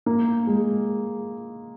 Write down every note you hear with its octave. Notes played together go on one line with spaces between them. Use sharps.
A#3
G#3